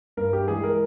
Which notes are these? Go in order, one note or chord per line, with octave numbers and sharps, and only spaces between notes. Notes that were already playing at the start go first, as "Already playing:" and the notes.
G2 A#4
G4
E3 G#3 G#4
A#4